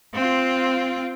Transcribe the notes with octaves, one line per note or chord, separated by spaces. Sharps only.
C4 F4